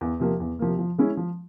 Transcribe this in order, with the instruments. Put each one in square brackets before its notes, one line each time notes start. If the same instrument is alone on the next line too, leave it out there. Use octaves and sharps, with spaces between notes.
[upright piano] E2
C3 F3 A#3
E2
C3 F3 A#3
F3
G#3 C#4 E4 G#4
F3